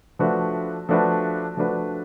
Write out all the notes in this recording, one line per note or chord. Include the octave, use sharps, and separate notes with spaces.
F3 A3 D4 F#4 B4
F3 A3 D4 F#4 B4
F3 A3 D4 F#4 B4